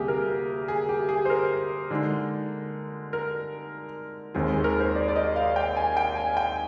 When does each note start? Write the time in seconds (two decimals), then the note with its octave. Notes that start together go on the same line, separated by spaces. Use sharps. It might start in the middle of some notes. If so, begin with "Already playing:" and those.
Already playing: D2 C3 G3 A#3 G4 G#4
0.08 A#4
0.68 G#4
0.89 G4
1.09 G#4
1.25 C5
1.30 A#4
1.91 D3 G#3 D#4
3.13 A#4
4.34 D#2 D#3 G#3 C4 D#4 G#4
4.49 G#4
4.64 A#4
4.80 C5
4.95 D5
5.08 D5
5.16 D#5
5.36 F5
5.56 G5
5.77 G#5
5.97 G5
6.17 G#5
6.37 G5